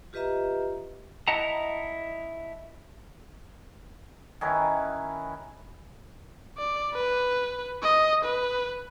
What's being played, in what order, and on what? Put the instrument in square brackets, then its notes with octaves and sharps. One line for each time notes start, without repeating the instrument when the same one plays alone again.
[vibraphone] F4 G4 B4 D#5 E5 A#5
[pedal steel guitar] E4 D#5 F#5 A5 A#5
[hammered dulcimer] D#3 C#4 E4 B4
[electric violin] D5
B4
D#5
B4